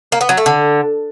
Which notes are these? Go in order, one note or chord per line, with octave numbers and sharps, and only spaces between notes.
A#3
B3
F#3
A3
D3